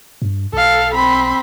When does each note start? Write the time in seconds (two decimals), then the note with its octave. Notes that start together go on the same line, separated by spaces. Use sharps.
0.22 G2
0.53 B1 A4 F5
0.94 C4 B5